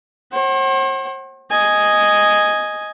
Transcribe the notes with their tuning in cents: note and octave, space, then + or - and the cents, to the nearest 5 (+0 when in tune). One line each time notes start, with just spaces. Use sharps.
C5 +45 F#5 +35
D#5 +0 G#5 +0